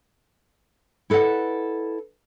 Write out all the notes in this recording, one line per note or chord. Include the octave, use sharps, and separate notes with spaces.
E4 A4 B4 D#5 F#5